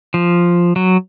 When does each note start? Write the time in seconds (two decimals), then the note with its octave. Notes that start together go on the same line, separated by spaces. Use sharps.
0.14 F3
0.76 F#3